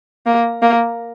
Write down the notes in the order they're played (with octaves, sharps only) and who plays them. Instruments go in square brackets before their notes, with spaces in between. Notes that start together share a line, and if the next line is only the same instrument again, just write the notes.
[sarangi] A#3
A#3